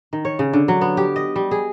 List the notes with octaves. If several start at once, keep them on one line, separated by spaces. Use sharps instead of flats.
D#3
C#5
C#3
D3
F#3
B3
G4
D#5
G3
G#4